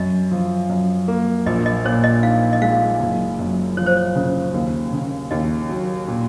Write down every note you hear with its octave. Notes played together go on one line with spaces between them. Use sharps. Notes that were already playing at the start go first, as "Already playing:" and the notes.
Already playing: F#2 D#5
F3
F#2
A#3
A#1 D#5
D#5
A#2 C#5
D#5
D#4 F5
D#5
G#3 F5
F#1
F#2
F3 C#5
C5
C#5
C#3
D#2
C#3
D#2 D#5
F#3
A#2